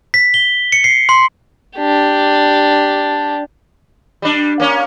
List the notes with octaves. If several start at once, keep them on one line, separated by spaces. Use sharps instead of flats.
B6
G7
C#7
C7
C6
D4 G4
G3 D4
A#3 C#4